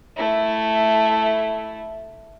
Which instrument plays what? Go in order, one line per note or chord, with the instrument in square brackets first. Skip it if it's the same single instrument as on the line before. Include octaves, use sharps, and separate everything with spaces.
[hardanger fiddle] A3 E4